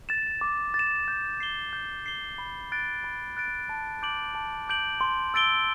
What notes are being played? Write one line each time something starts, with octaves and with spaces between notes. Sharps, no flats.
A6 E7
D6
A6
E7
G6
C7 G7
G6
C7 G7
B5
F#6 A6 D7
B5
F#6 A6 D7
A5
D6 G6 D7 F#7
A5
D6 G6 D7 F#7
C6
E6 A6 D7 G7